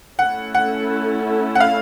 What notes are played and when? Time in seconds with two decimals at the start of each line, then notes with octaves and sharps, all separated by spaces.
0.19 A3 C#4 E4 A4 F#5
0.55 F#5
1.55 F#5
1.60 F5